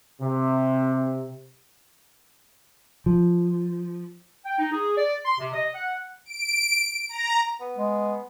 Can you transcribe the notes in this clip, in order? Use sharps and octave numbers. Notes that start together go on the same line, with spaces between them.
C3
F3
G5
D#4
G#4
D5
C6
C3
D#5
F#5
D7
A#5
B3
G#3